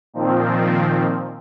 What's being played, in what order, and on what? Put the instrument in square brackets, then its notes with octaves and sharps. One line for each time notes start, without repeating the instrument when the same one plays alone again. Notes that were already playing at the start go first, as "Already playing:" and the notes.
[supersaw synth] A#2 D#3 F3 C4